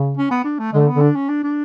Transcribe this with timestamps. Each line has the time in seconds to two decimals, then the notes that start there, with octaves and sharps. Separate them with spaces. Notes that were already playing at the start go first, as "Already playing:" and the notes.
Already playing: C#3
0.17 C#4
0.31 B3
0.45 D4
0.59 A3
0.73 D3 G#3
0.80 A3
0.87 B3
0.94 D3
1.01 D4
1.15 C#4
1.29 D4
1.44 D4